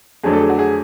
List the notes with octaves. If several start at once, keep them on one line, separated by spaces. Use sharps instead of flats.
F2 D3 F#3 A3 D4 G#4
A4
G#4
F#4
G#4